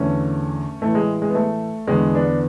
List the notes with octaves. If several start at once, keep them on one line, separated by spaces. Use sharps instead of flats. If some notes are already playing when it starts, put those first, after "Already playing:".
Already playing: E2 D3 A3 C#4
A2 E3 A3
G#3
G#3
B3
A3
E2 D3 G#3 B3
B3 D4